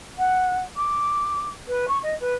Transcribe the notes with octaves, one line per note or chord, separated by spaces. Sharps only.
F#5
D6
B4
C#6
D#5
B4